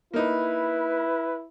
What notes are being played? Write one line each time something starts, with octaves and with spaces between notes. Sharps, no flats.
A#3 D#4 E4 B4